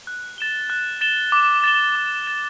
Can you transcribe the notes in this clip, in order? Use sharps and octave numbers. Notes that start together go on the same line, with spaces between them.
F#6
A6 E7 G7
F#6
A6 E7 G7
D6
A6 E7 G7
D6
A6 E7 G7